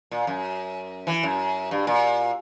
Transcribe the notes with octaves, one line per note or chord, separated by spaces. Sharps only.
A#2
F#2
E3
F#2
G2
A#2